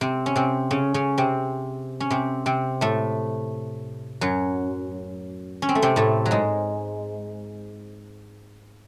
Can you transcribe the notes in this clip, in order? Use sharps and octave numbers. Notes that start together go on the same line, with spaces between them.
C3 C4
C#4
C3 C4
C#3 C#4
C#3 C#4
C3 C4
C#4
C3 C4
C3 C4
A2 A3
F#2 F#3
C#4
C4
A3
C3 C4
A2 A3
F#3
G#2 G#3